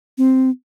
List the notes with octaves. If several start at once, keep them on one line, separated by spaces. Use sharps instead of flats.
C4